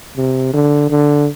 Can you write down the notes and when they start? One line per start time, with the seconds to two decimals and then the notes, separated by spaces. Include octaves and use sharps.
0.17 C3
0.54 D3
0.90 D3